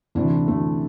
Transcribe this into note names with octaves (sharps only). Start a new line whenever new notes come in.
D2 C3 E3 A3 C4 D4
D2 C3 E3 A3 C4